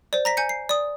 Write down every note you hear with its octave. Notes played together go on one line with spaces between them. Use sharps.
C5 D5
A#5 A#6 B6
G#5 G6 C#7
C7
D5 D#6